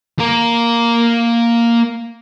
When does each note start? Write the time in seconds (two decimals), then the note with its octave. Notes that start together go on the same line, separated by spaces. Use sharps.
0.19 A#3 A#4